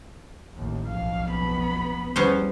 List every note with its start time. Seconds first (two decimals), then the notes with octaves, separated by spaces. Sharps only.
0.56 A1 D#2
0.87 B1 F2 F5
1.29 B3 B5
2.16 E2 G3 B3 C#4 C5